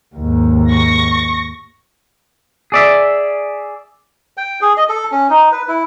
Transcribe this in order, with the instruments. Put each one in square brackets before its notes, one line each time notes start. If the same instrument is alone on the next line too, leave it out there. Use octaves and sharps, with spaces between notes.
[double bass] D#2 G#2
[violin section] C#6 A#6
[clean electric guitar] G#4 D5 E5
[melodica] G5
G#4
D#5
A4
C#4
D#4
B4
E4